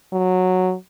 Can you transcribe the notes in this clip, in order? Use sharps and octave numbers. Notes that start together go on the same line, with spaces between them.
F#3